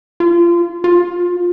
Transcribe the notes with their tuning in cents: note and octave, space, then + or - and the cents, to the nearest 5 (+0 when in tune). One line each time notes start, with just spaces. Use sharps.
F4 -25
F4 +20